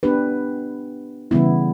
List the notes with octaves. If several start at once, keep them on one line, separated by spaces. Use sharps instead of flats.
B3 D4 G4 B4
C#3 E3 G3 B3 E4